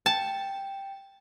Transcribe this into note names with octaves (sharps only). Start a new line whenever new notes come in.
G5 A5